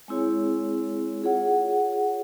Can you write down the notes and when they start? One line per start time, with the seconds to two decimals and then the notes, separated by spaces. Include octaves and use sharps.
0.08 G#3 C4 E4 G#4 C#5
1.22 F4 G#4 C#5 F#5